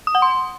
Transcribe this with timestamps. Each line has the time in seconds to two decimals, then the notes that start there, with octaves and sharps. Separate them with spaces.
0.07 D#6
0.15 F#5
0.22 C6